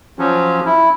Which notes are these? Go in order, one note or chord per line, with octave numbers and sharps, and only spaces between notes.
F3 F#3 C#4
E4